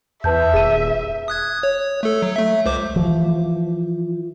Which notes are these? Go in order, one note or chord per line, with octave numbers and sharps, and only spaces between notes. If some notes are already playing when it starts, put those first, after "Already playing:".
E2 B4 E5 A5 G6
D#1 G#4 D#7
D#6 F#6 G#6
C#5
A3 A4
F#3
A3 E5
C#2 C5 D6
E3 F3